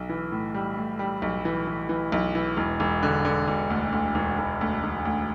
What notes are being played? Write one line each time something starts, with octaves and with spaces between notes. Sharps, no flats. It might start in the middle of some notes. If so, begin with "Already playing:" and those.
Already playing: B1
E3
A2
G3
A2
G3
B1
E3
E3
E3
B1
E3
E1
E1
D3
D3
E1
D2
D2
E1
E1
D2
E1
D2